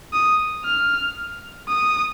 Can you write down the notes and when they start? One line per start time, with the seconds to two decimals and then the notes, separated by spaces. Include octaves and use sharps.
0.13 D#6
0.65 F6
1.69 D#6